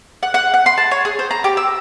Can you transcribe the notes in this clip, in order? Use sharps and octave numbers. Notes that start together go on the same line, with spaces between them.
F#5
F#5
F#5
C6
A5
C#5
G#4
C5
A#5
G4
E6